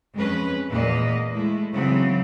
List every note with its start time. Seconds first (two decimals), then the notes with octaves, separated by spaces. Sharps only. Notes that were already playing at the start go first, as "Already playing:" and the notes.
0.15 F2 G#3 C#4 B4
0.70 E2 A#2 A#3 B4 D#5
1.32 G#3 A3 E4
1.73 C#3 E3 F#3 B3 C4